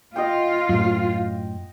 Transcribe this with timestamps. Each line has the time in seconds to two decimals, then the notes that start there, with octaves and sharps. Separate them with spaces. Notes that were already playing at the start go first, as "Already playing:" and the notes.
0.16 F4 D#5 F#5 G5
0.69 F#2 A2